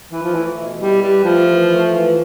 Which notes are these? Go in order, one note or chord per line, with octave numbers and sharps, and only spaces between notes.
E3 B4
F3
E3 A3
B2
G3 E4
G3 B4
F3 A3
E3
A3
E3